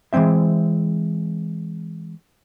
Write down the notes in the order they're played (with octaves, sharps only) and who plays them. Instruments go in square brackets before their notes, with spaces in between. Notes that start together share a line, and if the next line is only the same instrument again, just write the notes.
[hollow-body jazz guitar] E3 G#3 A#3 C4 E5